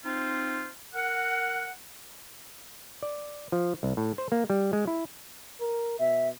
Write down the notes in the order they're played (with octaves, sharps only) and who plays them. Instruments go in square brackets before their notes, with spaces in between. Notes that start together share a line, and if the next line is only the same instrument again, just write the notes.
[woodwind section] C4 D#4 F4 C5
A#4 F#5
[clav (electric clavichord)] D5
F3
C2
A2
C5
A#3
G3
G#3
E4
[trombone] A#4
[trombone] B2 [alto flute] E5